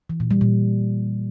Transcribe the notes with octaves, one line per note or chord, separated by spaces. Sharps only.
E3
A#2
G3
A#2